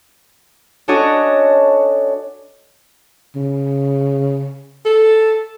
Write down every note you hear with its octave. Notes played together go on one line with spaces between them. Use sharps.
C#4 D4 F#4 A4 C#5 D#5
C#3
A4